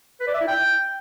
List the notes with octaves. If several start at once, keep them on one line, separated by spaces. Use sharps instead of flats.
B4
D5
E5
E4
G5